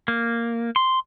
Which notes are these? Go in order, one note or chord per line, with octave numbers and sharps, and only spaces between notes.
A#3
C6